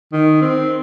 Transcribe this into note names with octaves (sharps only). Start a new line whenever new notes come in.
D#3
C4